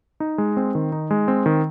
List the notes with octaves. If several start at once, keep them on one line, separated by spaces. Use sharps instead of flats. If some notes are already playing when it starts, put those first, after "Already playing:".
D#4
G#3
C4
D#3
D#4
G#3
C4
D#3